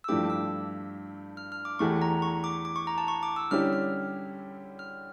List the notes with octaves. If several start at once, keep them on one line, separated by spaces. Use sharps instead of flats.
E6
G2 F3 A3 E4 G4 D6
E6
F6
F6
D6
E2 E3 A3 E4 G4 C#6
A#5
C#6
D6
D6
C#6
A#5
A5
C#6
D6
E6
D3 G3 C#4 E4 G4 F6
F6
F6